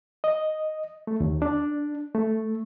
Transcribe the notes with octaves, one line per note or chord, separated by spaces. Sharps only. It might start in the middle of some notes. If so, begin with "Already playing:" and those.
D#5
A3
D#2
D4
A3